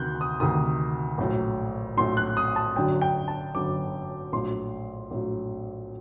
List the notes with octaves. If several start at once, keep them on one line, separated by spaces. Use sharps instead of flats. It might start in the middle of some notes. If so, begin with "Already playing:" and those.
Already playing: D2 C3 D#3 F#6 G6
D#6
D2 C3 D#3 D#6
A#1 A2 F#3
A#1 A2 F#3 C6
F#6
D#6
A5
G1 F#2 D3 F#3 G5
G5
A5
G1 F#2 D3 F#3 D6
A#1 A2 F#3 C6
A#1 A2 F#3